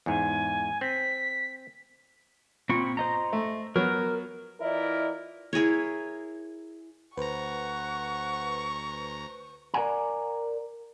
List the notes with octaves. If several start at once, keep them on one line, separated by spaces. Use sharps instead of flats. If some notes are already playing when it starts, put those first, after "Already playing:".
E2 G#2 G#5
C4 B6
A#2 C4 B5 C#6
C5 D#5 A#5
A3
F#3 B3 A#4
E3 E4 F4 A#4 D5 D#5
E4 G#4 A#4 C#5
D2 B4 C5 F#5 A#5 C#6
A#4 D5 F5 F#5 G#5 A#5